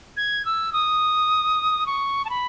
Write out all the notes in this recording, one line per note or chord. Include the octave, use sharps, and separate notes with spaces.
G#6
E6
D#6
C#6
A5
B5